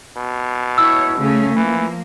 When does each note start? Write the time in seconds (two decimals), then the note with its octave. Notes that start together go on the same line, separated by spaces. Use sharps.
0.17 B2
0.78 E4 C#5 E6
1.18 C#3 A3 C#4
1.56 E3 F3 A#3